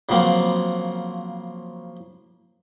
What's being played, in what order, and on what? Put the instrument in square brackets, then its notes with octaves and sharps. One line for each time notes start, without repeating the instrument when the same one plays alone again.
[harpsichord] C#3 F3 F#3 A#3 C4